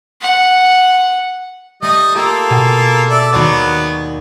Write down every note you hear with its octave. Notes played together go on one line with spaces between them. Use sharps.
F#5
G3 A3 D#5
A#3 F4 G4 A4
B2 G#4 G#5
A4 D5 E5
D#2 F#3 B3 C5 D5